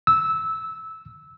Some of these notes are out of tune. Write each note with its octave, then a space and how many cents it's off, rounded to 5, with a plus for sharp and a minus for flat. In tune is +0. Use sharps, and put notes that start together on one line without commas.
E6 -15